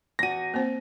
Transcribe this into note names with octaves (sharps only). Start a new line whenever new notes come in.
E2 F#4 A#6 D#7
A#3 C4 C5